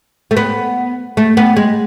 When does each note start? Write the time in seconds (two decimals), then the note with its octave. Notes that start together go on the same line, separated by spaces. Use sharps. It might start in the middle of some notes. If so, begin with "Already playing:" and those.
0.31 A3
0.37 B3
1.17 A3
1.37 B3
1.57 G#3